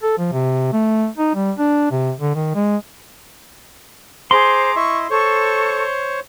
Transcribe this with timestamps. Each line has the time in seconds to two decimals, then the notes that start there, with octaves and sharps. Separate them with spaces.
0.03 A4
0.18 F3
0.32 C3
0.73 A3
1.18 D#4
1.35 G3
1.58 D4
1.91 C3
2.20 D3
2.35 D#3
2.55 G#3
4.31 G#4 C5 A#5 C6 D6
4.76 E4 D#5 E5 C#6
5.10 A4 C5 C#5 C#6